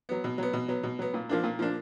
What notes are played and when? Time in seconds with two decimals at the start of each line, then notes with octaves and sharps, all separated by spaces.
0.09 F#3 B3
0.24 B2
0.38 F#3 B3
0.53 B2
0.68 F#3 B3
0.83 B2
0.99 F#3 B3
1.14 A#2
1.29 F3 A#3 D4
1.43 A#2
1.59 F3 A#3 D4